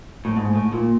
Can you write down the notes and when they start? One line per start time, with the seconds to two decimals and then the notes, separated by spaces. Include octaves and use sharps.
0.25 A2
0.37 G#2
0.55 A2
0.72 A#2